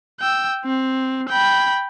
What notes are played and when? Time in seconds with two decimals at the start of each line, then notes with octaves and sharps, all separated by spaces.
0.21 G5 E6
0.65 C4
1.29 G5 B5